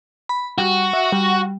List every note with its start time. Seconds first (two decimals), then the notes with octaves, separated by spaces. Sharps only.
0.29 B5
0.58 G3 F#4
0.93 E5
1.12 G3